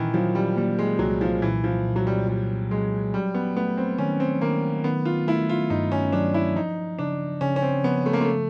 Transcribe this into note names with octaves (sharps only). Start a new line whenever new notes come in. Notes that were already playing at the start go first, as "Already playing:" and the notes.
Already playing: A#2 D#3 E3
F3 F#3
G3
G3 A#3
G#3
C2 F#3
F3
A#2 E3
F3
A#2
F#3
G3
A#2 G3
F#3 G#3
F#3 G3
B3
A3 B3
C4
D#3 C#4
C4
D#3 A#3
D#3 B3
F4
A3 E4
F4
G2 D#4
C#4
F#3 D4
E4
F3 D#4
C#3 D4
C#3 C#4
C#4
C4
F3 B3
A3
A#3
A3